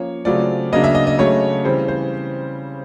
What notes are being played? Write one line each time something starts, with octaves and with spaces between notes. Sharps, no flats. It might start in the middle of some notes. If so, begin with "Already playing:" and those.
Already playing: F3 A#3 C#4 C#5
C#3 F#3 A3 C4 F4 D5
C#3 F#3 A#3 D4 D#5
E5
D#5
D#5
C#3 F#3 A3 C#5
C#3 E3 G3 C4 C5
C5